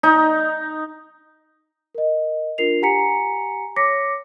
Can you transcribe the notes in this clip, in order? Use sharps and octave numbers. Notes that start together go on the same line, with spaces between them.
D#4
A#4 D#5
D4 F4 A#4 C7 F7
G4 F#5 G#5 A#5 B6 C#7
C#5 D6 A#6 B6 C#7